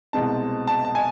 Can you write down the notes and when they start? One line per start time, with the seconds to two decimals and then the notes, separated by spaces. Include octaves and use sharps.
0.13 C2 B2 G#3 C4 A5
0.67 A5
0.85 A5
0.95 G#5